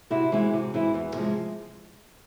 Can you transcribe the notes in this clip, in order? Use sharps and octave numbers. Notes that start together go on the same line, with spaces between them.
C3 E4 F#4
E3 G#3 C4 E4
C3
E3 G#3 C4 E4
E2
C3 F3 G#3